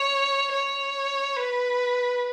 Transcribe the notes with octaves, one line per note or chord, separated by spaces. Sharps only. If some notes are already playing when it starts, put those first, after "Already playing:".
Already playing: C#5
C#5
B4